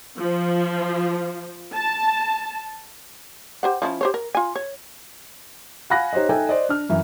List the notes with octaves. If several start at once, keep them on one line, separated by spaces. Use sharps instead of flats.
F3
A5
G4 C5 F#5
F3 C#4 E4
G4 C5 C#5
A#4
F4 G#5
C#5
F5 F#5 G#5 B5 F#6 A#6
D#4 G4 C5 C#5 D#5
D#4 A4 D#5 E5 G5 G#5
C5 D5 D#5
D4 F6
F#2 E3 E5